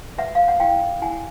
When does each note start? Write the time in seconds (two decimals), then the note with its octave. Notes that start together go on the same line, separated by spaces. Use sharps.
0.18 B4 E5 F#5
0.35 F5
0.48 F#5
0.60 E4 F5 G5
1.02 E4 F#5 G#5